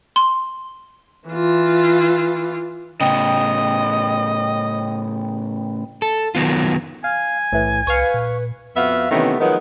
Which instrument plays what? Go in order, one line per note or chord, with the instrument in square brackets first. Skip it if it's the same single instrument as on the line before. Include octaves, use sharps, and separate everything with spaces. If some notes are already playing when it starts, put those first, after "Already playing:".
[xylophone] C6
[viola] E3 F4
[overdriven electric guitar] A2 C#3 [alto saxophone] D#5 [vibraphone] G5
[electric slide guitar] A4
D#3 F#3 B3 F4
[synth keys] F5 [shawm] G#5
[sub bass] B1 [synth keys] A2 E3
[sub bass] C2 [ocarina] B4 [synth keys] F5 C#6
[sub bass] A#2
[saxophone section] F2 B3 F#4 E5 F5
C3 D#3 E3 A3 B3 C#4
D#3 F3 F#3 G#3 B3